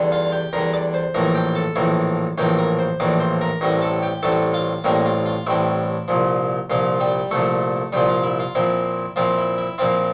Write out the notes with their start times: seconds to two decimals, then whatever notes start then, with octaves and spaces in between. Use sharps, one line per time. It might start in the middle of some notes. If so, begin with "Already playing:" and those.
Already playing: E2 D3 G3
0.12 F4 F5
0.32 G4 G5
0.53 E2 D3 G3 A#4 A#5
0.73 D5 D6
0.94 C5 C6
1.14 A#1 A2 E3 A#3 A#4 A#5
1.35 G4 G5
1.55 A4 A5
1.76 A#1 A2 E3 A#3
2.38 A#1 A2 E3 A#3 G4 G5
2.58 A#4 A#5
2.79 C5 C6
3.00 A#1 A2 E3 A#3 D5 D6
3.20 C5 C6
3.41 A#4 A#5
3.61 A1 A2 G3 C4 A#4 A#5
3.81 A4 A5
4.02 G4 G5
4.23 A1 A2 G3 C4 A4 A5
4.53 F4 F5
4.84 A1 A2 G3 A#3 C4 A#4
5.06 F4
5.26 F4
5.46 A1 A2 G3 C4 E4
6.08 C2 A#2 F3
6.70 C2 A#2 F3 F4
7.00 G3 G4
7.31 C2 A#2 F3 A3 A4
7.93 C2 A#2 F3 G3 G4
8.08 F4
8.23 E4
8.39 F4
8.55 A#2 F3 C4 E4
9.16 A#2 F3 C4 E4 F4
9.38 E4
9.58 E4
9.78 A#2 F3 C4 E4 F4